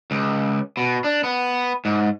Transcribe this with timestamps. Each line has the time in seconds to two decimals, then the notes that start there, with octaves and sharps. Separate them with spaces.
0.11 C#2
0.77 B2
1.04 D4
1.24 B3
1.85 G#2